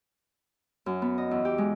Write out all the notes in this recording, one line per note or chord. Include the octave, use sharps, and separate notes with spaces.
F#2
B3
D#5
E2
G4
G#3